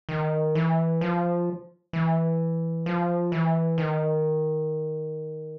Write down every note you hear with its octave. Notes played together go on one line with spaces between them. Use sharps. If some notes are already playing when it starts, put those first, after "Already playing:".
D#3
E3
F3
E3
F3
E3
D#3